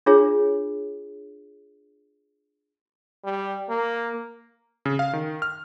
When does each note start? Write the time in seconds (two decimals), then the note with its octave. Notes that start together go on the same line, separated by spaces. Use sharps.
0.06 D4 F4 G#4 C#5
3.24 G3
3.69 A#3
4.85 C#3
4.99 F5
5.13 D#3
5.42 F6